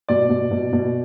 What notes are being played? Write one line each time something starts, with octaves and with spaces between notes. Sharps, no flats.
B2 D5
B2
B2
B2